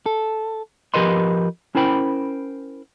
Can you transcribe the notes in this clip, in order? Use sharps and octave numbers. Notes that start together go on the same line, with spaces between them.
A4
F3 G4 A#4 B4 D#5 C6
C#4 E4 A#4 C5 G5 B5